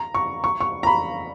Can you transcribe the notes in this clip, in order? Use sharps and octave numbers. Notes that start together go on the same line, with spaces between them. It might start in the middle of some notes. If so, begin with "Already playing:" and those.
Already playing: A#5
C#6
C#6
C#6
A#5
B5